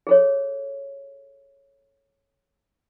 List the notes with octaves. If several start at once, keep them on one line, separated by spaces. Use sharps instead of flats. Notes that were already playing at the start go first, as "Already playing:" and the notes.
G#4 A4 C#5